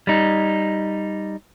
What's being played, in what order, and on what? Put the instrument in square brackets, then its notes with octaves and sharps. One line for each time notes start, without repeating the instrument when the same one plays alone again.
[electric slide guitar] G3 D#4